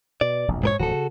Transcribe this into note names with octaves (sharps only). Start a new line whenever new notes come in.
B2 D5
E1 A#1 F2
G#2 A#4 C#5
D1 E3 F3 F#4 A4
C#3